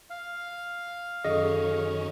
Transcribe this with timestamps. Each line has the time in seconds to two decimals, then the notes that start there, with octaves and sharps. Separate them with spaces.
0.10 F5
1.24 F#2 D#3 C#4 G#4 A4 D#5